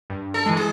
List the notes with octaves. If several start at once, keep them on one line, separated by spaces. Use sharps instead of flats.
G2
A4
E3 G#3
G#4